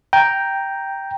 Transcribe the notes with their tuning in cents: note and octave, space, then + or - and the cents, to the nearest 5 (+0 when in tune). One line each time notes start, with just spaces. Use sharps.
G5 +0 A#5 +0